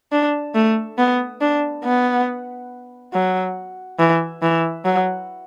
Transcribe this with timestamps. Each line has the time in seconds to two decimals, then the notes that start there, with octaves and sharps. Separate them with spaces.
0.12 D4
0.55 A3
0.98 B3
1.41 D4
1.84 B3
3.13 F#3
3.99 E3
4.42 E3
4.85 F#3